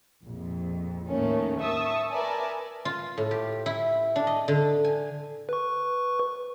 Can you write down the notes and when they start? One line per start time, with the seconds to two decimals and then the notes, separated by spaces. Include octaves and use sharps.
0.23 A#1 F2
1.09 D#2 A2 D#3 A3 C#4
1.60 E5 A5 C#6 D#6 E6
2.10 A#4 B4 D5 E5 G#5 A5
2.85 F4
3.18 A2
3.31 G4
3.66 E4
4.16 D4
4.27 D#5
4.48 D3
4.84 G#5
5.49 B4 C#6